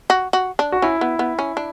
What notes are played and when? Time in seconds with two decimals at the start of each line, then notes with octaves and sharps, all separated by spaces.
0.10 F#4
0.33 F#4
0.59 D4
0.72 F#4
0.82 C#4 E4
1.01 B3
1.19 B3
1.39 C#4
1.57 D4